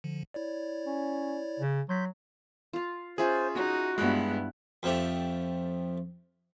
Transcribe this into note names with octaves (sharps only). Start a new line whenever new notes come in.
D3 F3
E4 C#5 D5
C#4
C#3
F#3 C6 G6 B6
F4 F5
C#4 F4 G#4 C5 E5 G#5
D#4 F#4
G2 G#3 B3 E4 F#6
F2 F3 A3 G4